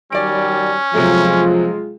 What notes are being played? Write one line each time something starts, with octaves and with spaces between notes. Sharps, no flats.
D#3 F#3 G3 C#4 D5 D7
C3 F3 F#3 G#3 A3 F4